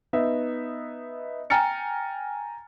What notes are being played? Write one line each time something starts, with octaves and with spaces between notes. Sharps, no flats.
B3 D#4 E5
G5 G#5 A#5 F6 A6 C#7